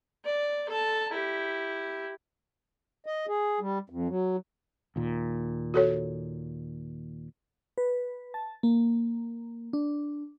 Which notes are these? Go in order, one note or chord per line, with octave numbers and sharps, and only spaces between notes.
D5
A4 A5
E4 G4
D#5
G#4
G3
F2
F#3
D#2 A#2
F#4 A4 C#5
B4
A5
A#3
D4